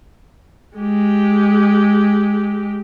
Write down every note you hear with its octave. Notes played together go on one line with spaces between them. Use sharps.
G#3 G4